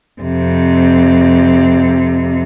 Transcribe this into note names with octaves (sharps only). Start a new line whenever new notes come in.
F2 C3